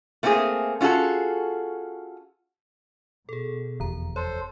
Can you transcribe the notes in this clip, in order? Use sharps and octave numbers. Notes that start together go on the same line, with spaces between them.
A3 A#3 C4 F#4 G#4
C#4 F4 F#4 G#4 A4
B2 G#4 A4
F1 E2 D3 A#5
A4 C5 C#5